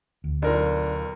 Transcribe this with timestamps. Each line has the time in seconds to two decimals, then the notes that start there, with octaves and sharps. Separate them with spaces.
0.24 D2
0.42 B1 D4 F4 A#4